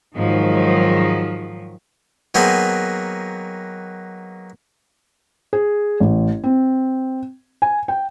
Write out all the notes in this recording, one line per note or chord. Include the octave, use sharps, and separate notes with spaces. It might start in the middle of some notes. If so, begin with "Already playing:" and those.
G#2 D#3 F3 F#3
D#3 F#3 A#3 B3 G#4 C5
G#4
A1
C4
G#5
G5